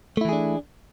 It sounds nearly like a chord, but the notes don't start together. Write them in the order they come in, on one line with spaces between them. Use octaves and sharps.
A3 E4 E3 G#4 D4